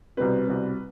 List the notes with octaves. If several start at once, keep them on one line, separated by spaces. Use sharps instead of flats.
C2 B2 G3 C4 B4
C2 B2 G3 C4